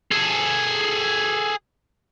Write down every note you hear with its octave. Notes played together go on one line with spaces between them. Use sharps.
G#4 A4